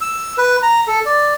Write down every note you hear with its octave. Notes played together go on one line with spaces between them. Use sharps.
E6
B4
A#5
A4
D5